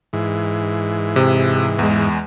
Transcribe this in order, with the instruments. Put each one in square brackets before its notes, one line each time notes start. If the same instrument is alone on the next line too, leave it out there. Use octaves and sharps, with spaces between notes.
[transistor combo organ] G#2 E3
[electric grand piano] C3
E2 G#3